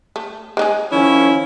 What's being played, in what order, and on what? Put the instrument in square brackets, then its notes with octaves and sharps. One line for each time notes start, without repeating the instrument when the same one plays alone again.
[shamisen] A3
G#3 D#4 G#4
[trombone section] D#3 F3 C#4 [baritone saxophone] E4